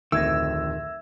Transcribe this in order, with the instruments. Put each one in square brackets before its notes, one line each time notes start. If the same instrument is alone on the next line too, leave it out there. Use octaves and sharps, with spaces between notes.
[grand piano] D1 F2 A2 [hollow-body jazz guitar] D#3 [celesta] E5 G#6 A#6 [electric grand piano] E6